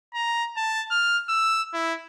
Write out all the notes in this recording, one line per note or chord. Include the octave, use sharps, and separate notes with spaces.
A#5
A5
F6
E6
E4